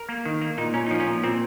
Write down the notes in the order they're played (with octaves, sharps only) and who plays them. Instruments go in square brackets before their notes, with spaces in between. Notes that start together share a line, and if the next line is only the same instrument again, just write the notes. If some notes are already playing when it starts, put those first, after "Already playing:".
Already playing: [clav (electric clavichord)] A#4
A#3
D#3
A#3
A#2 D#4
A#2 C#4
F3 D#4
C#4
A#2
A#2 C4